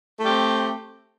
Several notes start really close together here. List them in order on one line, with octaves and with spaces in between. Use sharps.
A3 G4 C4